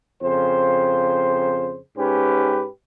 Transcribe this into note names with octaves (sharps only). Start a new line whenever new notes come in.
F2 C#3 C5
G#2 C#4 G4 B4